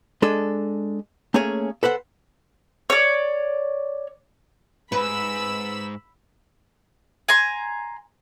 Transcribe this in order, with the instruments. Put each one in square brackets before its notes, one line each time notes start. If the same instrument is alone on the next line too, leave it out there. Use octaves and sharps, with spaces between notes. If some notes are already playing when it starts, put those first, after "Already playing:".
[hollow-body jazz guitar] G#3 D4 A4 D#5
A3 A#3 C#4 G#4 C#5 G#5
A4 B4 C5 F#5
[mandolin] C#5 D5
[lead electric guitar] F2 G#2 [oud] B4 [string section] B5 E6
[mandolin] G#5 A#5 C6